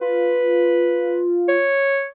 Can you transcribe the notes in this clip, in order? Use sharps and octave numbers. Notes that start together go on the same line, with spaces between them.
F4 B4
C#5